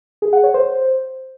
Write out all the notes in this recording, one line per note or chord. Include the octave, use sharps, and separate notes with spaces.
G#4
F#5
C#5
C5